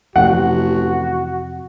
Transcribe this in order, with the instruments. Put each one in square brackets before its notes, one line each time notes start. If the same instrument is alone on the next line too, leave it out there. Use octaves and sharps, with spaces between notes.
[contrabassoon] A1 [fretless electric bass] F2 C3 [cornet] F#4 [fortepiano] F#5